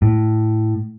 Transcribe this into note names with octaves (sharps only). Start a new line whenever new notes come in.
A2